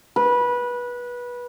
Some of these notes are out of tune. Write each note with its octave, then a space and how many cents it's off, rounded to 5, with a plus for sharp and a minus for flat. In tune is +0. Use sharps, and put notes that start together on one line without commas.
B4 -20